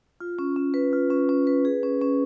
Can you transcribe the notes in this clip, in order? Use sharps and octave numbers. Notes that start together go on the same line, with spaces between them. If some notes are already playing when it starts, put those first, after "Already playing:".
F4
C#4
C#4
B4
F4
C#4
C#4
B4
G#4
C#4
C#4